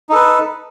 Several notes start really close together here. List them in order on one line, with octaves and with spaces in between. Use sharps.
D#4 A4 B4